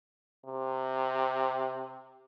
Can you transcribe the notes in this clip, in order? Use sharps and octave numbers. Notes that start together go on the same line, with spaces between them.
C3